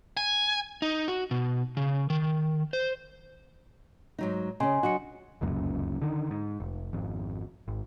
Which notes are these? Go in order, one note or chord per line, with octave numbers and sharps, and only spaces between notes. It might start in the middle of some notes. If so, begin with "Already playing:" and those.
G#5
D#4
F#4
B2
C#3
D#3
C5
G#2 F#3 D#4
C#3 C#4 D#5 G#5 C6
F#3 D4 F#4 D#5 C#7
F1 C#2 F#2 A#2
D3 D#3
G#2
F1
G#1 F2
G#1